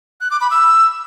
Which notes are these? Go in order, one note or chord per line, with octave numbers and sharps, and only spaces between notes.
F#6
D6
B5
E6